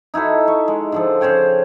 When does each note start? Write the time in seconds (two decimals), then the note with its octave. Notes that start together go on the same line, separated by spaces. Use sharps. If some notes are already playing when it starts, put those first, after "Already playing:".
0.14 D#4 E4 F#4 A4
0.48 C#6
0.68 G#3
0.92 D3 F3 A4
1.21 C#3 C5 C#5 G5